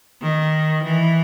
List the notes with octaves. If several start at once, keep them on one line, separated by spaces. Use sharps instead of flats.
D#3
E3